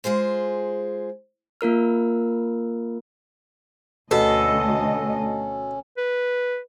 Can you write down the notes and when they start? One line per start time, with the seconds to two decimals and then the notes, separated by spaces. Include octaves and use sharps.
0.04 G#3 F4 G#4 C5
1.61 A#3 F4 A#4 F6
4.11 D2 B2 C#4 A4 D#5
5.97 B4